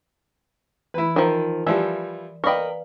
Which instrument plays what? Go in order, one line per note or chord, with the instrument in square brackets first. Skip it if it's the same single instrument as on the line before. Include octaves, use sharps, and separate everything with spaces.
[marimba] E3 B5 [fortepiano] E4 B4
[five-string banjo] D#3 F3 [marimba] A#4 A#5
[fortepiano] E3 F3 G3 [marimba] D5 [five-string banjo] E5
[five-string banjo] A#4 D#5 [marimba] B4 D5 F5 [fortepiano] G5 B5 C#6